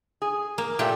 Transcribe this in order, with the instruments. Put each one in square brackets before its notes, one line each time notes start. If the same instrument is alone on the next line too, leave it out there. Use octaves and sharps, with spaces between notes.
[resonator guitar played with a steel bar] G#4
[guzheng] A#3
[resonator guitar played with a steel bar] A#2 A3 G5 [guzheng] G4